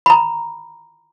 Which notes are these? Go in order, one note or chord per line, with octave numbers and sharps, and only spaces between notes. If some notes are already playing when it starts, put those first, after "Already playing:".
A#5 B5